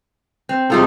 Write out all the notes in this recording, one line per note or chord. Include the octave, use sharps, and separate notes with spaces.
C4
C3 G3 G#3 D#4 F4 A4